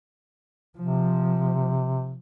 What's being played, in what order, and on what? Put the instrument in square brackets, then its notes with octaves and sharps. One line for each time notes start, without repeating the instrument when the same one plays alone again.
[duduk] C3 [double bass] F3